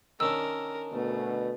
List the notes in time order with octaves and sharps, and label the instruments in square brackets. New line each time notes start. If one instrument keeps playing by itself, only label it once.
[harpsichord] D#3 C#4 D4 [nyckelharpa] A#4 [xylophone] E6
[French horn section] D2 B2 [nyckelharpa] A3